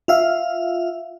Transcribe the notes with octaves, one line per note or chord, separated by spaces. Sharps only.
F4 E5 F5